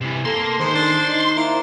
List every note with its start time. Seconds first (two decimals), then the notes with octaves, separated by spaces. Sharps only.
0.01 C3 E3
0.25 A#3 A4 C6
0.60 G#2 D#3 C5
0.75 D4
1.05 D#4
1.36 A#3 E4